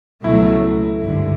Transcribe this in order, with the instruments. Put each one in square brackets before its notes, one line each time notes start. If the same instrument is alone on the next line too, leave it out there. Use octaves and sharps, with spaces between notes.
[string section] C#2 B2 F#3 A3 [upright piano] E4
[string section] G#1 G2 D3